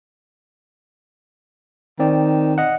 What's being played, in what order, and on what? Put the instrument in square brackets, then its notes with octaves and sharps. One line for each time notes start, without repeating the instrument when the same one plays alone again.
[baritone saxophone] D#3 [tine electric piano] C4 D5
[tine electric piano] D#5 F#5